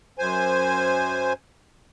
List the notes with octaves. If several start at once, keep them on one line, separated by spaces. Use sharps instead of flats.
F#2 C5 G#5